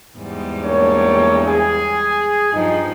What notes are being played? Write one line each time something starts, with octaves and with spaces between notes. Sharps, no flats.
E2 G#2 G3
A#3 D4 C#5
G#4
G2 F3 D#4